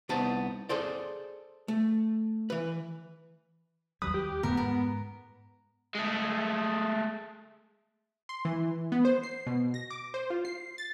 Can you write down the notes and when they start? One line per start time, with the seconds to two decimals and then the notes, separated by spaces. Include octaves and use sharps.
0.09 C2 B3 D#4 C5 A5
0.69 G#4 A4 C5 D5
1.68 A3
2.50 E3 B4
4.02 D#2 F#3 G3 B4 D#6
4.14 G4
4.43 F2 A2 D3 B3 A#4
4.57 G#2 A#4
5.95 G#3 A3
8.29 C6
8.45 E3
8.92 B3
9.05 C5
9.23 C7
9.47 B2
9.74 A#6
9.90 D6
10.14 C5
10.30 F4
10.45 C7
10.78 A6